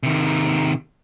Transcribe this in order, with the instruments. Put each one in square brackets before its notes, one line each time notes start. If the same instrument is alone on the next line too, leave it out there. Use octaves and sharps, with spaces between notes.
[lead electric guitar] C3 D#3